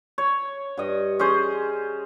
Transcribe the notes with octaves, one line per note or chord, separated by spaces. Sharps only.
C#5
G2 D#5
C#4 G#4 C5